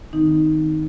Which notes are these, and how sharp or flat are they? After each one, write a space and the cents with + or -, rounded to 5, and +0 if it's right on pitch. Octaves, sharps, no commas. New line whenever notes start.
D#3 +0 C4 -25 D#4 +0